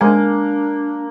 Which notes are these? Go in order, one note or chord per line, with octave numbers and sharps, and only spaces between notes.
G#3 A#3 D4 G#5